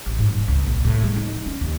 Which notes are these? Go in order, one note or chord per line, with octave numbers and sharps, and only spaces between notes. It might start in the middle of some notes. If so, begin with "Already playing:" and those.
A1
G#2
D#1
C#2
A#1
A2
G#3
D#4
C#4
D#2